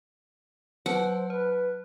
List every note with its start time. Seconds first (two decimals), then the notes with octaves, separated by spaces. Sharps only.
0.86 F#3 B4 C5 F#5 A5
1.30 B4 C5